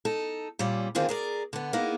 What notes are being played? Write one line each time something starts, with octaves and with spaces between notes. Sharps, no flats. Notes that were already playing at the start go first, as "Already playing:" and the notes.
D#4 A4
A#2 G3 C#4
D3 D#3 A#3 C4 F4 G#4
G#4 A#4 D5
D3 B3
A#3 B3 D#4 E4 G#4